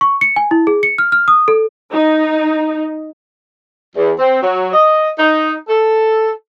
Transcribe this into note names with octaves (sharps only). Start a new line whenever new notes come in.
C#6
C#7
G#5
E4
G#4
C#7
F6
F6
D#6
A4
D#4
E2
C4
F#3
D#5
D#4
A4